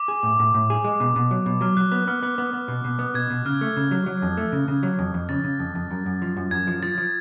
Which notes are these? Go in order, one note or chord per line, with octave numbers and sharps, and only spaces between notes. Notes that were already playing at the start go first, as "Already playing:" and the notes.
Already playing: D6
G#4
A2
A2
A2
G#4
G#3
B2
B2
F#3
B2
F#3 F6
F#3 F#6
B3 F#6
B3 F6
B3 F#6
B3
B3
B2
B2
B3
B2 G#6
B2
C#3 F6
A3
C#3
F#3
F#3
F2
A3
C#3
C#3
F#3
F2
F2
C#3 A6
C#3
F2
F2
F#2
F#2
F3
F#2
F#2 G#6
F3
F3 A6
F3